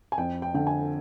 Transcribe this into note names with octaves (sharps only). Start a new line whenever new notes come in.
G#5
F2 G5
G5
D3 G5
G#5